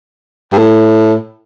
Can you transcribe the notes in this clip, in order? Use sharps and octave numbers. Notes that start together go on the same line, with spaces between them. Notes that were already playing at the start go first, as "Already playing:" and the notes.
G2
A2